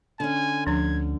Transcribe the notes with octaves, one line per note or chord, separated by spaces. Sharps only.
D3 C#4 G#5
D2 F3 D4 G#6